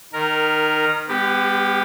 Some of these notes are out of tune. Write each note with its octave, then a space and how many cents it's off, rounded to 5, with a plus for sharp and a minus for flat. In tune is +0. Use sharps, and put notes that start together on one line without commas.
D#3 -20 A#4 +0
G#3 -45 B3 +30 G4 +0